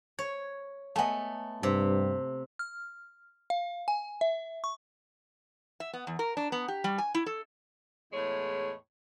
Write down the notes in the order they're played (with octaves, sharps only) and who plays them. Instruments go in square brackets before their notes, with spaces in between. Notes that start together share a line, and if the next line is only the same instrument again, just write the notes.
[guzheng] C#5
[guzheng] A3 B3 [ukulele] D#5 G#5 A5
[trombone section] G2 [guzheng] C3
[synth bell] F6
F5
G#5
E5
C#6
[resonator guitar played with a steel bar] E5
B3
E2
A#4
D4
B3
G4
G3
G#5
E4
A4
[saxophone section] E2 A2 G#3 C#5